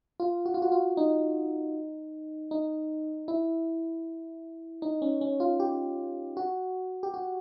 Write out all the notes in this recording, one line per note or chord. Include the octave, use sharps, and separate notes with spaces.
F4
F#4
F4
F#4
F4
D#4
D#4
E4
D#4
C#4
C#4
F4
G4
F#4
G4
F#4